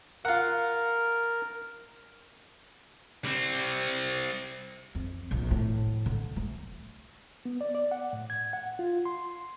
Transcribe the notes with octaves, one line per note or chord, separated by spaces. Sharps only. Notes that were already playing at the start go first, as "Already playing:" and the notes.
F4 A#4 F#5
G3 C4
F2
A#1
A2
D3
A3
B3
D5
D5
F#5
A2
G#6
F#5
F4
C6